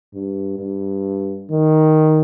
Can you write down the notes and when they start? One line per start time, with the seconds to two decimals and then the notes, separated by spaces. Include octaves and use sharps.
0.14 G2
0.59 G2
1.51 D#3